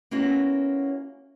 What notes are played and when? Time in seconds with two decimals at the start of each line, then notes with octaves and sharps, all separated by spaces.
0.11 A#3 B3 C#4 E4 F#4